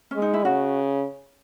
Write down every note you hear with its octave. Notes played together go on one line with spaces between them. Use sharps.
G#3 C#4
D#4
E4
C#3 F#4